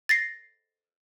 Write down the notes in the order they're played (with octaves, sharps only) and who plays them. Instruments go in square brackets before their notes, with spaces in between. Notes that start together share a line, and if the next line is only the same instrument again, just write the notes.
[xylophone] A6 A#6 C7